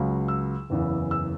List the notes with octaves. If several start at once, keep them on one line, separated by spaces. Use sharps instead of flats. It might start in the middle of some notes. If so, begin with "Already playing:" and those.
Already playing: C#2 C#3 F#3
E6
F#1 E2 C#3 E3
E6